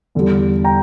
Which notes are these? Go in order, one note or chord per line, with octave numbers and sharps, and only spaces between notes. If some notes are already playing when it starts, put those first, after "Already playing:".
E2 D3 G3
G5 A#5